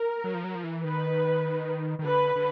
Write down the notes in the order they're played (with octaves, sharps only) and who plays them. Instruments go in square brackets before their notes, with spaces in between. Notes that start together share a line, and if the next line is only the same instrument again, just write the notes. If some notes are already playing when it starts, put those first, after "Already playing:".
Already playing: [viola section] A#4
[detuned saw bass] F#3
F3
F#3
F3
E3
[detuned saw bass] D#3 [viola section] B4
[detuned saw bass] D#3
[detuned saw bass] D3 [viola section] B4
[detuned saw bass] D3